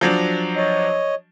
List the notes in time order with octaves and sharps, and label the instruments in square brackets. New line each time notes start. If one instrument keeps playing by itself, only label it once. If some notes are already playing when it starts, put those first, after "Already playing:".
[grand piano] F3 F#3 D4
[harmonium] C#5 D#5